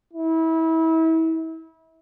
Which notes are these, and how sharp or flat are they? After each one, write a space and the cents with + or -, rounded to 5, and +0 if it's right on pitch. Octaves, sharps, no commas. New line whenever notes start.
E4 -30